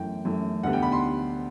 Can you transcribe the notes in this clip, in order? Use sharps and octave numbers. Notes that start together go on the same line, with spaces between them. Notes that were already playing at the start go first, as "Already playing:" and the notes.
Already playing: F#2 E3 A3 G5
F#2 E3 A3
D2 D3 G3 B3 F#5
G5
B5
C6